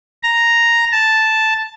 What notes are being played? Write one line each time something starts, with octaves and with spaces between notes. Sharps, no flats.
A#5
A5